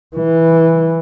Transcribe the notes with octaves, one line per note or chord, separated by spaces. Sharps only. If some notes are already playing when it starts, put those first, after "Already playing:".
E3